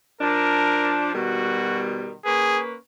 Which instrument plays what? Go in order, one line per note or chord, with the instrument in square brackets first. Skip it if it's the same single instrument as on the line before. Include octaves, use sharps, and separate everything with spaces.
[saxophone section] F3 D4 [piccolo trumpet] A#4
[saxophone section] B2 D#3 G3 [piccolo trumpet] F#4
[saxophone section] A#3 C#4 B4 [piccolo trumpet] G#4